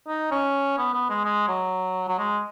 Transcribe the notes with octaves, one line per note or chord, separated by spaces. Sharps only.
D#4
C#4
B3
B3
G#3
G#3
F#3
F#3
G#3